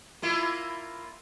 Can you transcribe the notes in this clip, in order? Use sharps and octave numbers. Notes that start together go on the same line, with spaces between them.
A#3 E4 F4